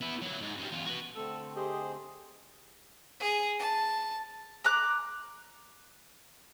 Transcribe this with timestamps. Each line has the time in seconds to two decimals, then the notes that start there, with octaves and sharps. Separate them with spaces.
0.01 B3 E4
0.22 F#3 E4
0.41 G#2
0.57 F#2 G3
0.72 E2 F4
0.86 F#4 B4
1.15 D3 A3 C4 A4 E6
1.56 G4 G#4 C5 D#5
3.20 G#4
3.59 A5
4.64 A#5 D6 F#6